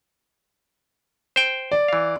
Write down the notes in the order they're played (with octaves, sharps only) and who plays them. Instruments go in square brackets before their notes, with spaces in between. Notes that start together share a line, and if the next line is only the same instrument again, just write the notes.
[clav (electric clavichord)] C5 G5
[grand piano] D5
[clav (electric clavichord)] E3 F5